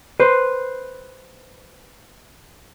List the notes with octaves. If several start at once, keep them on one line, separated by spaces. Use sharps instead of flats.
B4 C5